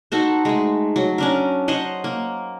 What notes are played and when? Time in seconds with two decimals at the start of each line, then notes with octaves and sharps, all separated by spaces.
0.12 D#4 F#4 A4 C5
0.45 G#3 A3
0.96 F#3
1.18 C#4 D4 A#4
1.68 C5 C#5 D#5 F#5
2.04 A#3